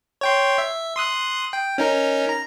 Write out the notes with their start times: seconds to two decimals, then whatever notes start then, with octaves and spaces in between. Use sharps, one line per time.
0.21 C#5 G5 C6
0.58 E5
0.96 C6 D#6 F#6
1.53 G5
1.78 C#4 D#4 A#4
2.29 A#5